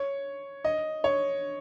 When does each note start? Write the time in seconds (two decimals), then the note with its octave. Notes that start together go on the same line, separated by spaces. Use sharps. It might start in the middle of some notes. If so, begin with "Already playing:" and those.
Already playing: C#5
0.64 D#5
1.04 C#5